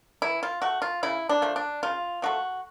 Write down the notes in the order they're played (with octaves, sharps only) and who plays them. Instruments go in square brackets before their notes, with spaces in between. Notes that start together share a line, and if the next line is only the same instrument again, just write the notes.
[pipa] E3 E4
F4
A3 F#4
F4
C#3 E4
D4
F3 A3
D4
C#3 F4
F3 A3 F#4